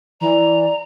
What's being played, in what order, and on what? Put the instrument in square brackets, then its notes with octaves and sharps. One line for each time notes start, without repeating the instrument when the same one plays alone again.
[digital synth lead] E3 [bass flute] D5 [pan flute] A#5